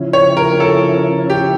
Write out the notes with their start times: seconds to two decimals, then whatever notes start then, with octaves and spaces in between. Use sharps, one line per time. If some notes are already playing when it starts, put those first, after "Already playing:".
Already playing: C#3 F3 C#4 E4
0.13 C#5
0.37 A#4
0.60 A4
1.30 G4